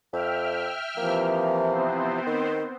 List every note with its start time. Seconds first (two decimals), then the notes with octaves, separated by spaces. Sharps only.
0.13 F2 E5 G5 F6
0.97 C3 E3 F3 A#3
1.72 B3 C4 C5
2.26 D#3